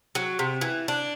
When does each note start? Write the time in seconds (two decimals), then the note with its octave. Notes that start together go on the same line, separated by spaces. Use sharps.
0.15 F#3
0.39 C3
0.61 E3
0.88 D4